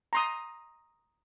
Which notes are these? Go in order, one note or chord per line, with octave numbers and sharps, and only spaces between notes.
A#5 C6 D#6